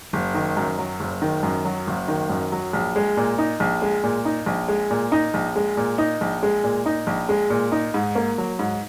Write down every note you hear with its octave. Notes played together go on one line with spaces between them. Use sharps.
F#1
D#3
F#2
F#3
F#1
D#3
F#2
F#3
F#1
D#3
F#2
F#3
A#1
G#3
A#2
D#4
A#1
G#3
A#2
D#4
A#1
G#3
A#2
D#4
A#1
G#3
A#2
D#4
A#1
G#3
A#2
D#4
A#1
G#3
A#2
D#4
G#2
A#3
F#3
G#2